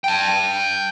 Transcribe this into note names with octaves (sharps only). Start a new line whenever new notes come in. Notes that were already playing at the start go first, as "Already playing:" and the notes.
G5 A5